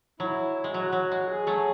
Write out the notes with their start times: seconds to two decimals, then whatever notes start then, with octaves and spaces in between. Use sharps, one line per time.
0.20 F#3 E4
0.64 G#3
0.74 F#3 F#4
0.92 F#3
1.12 G#3
1.30 G#4
1.47 F#3 A3